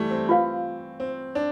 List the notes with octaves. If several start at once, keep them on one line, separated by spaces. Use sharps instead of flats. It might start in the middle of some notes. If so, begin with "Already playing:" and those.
Already playing: E3 G3 A3
C4
F4 B4 F5
C4
D4